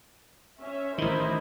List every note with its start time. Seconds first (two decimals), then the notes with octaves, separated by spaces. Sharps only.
0.61 C#4 C#5 E5
0.98 A1 D#3 E4 A#4 C5 D#5 E5